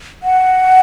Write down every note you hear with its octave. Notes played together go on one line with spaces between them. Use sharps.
F#5